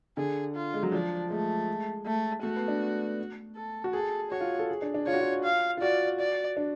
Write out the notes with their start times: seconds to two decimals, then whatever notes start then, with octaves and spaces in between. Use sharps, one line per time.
0.17 D3 G#4
0.56 F4
0.74 G#3
0.83 F#3
0.92 F3 D4
1.30 G#3 A3
2.06 A3
2.43 A3 F#4
2.56 B3
2.68 D4
3.56 A4
3.84 F#4
3.93 G#4 A4
4.31 F#4 C#5
4.41 F4
4.59 A4
4.69 G#4
4.82 D4
4.94 D4
5.07 F4 C#5
5.13 F#4
5.21 F4
5.44 F5
5.77 F4
5.82 F#4 D5
6.20 D5
6.57 D4